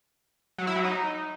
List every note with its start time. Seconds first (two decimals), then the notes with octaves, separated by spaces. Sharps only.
0.58 F#3
0.67 E4
0.76 F#3
0.85 D#4